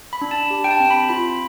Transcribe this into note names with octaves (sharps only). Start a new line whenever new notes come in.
B5
D4
A5
G4
G5
A5
C4
B5
F4 B5